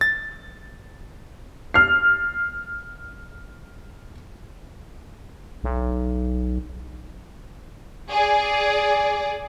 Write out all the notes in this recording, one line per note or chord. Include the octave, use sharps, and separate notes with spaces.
A6
F6 C7
B1
G#4 D5